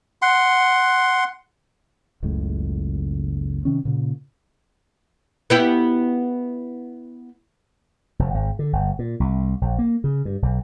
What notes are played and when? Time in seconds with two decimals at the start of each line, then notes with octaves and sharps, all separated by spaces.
0.22 F#5 C6
2.23 F#1 C#2 A2
3.65 C3 D#3 C#4
3.85 A#2 C#3
5.50 B3 E4 G4
8.19 F1
8.34 G#1
8.59 D3
8.73 G1
8.99 A#2
9.20 C2
9.61 A#1
9.79 A#3
10.04 C#3
10.25 G2
10.42 B1